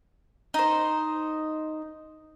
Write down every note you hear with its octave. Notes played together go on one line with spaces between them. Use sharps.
D#4 C5